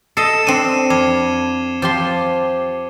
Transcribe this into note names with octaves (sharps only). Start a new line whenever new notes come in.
A4 D#5 C7 C#7 E7
C4 D4 D#7
F2 D6 G#6 G7
F3 G4 C6